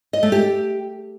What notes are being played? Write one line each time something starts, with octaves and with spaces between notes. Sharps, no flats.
D#5
A3
G4